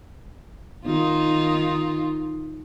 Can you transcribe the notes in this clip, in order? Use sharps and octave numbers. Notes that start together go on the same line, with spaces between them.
D#3 D#4 F4